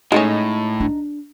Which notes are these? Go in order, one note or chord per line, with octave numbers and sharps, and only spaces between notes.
A2 G#3 A3 C#4 D#4
D4